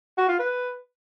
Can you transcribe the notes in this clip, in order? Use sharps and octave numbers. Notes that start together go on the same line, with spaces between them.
F#4
F4
B4